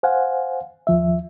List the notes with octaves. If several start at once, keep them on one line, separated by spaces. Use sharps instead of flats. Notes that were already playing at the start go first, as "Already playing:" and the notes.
C5 F5 F#5 G#5
D#2 F3 E5